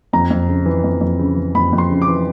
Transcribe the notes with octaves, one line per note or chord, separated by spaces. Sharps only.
F2 A#5
F2
C#3
E3
F2
F2
C#3
E3
F2 B5
F2
C6
C#3
D6
E3